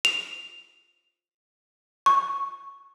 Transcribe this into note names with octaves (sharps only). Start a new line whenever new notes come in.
F7
C#6